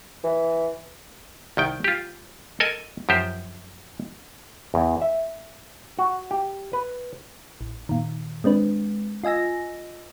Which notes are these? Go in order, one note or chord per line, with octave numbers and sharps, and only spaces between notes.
E3
C2 D#3 G5
F4 G4
A4 A#4 D#5 G#5
F#2 F3 G4 C5
E2
E5
F#4
G4
B4
A1
A#2 D#3
G#3 C4 D4 B4
F4 D#5 G#5 E6 A#6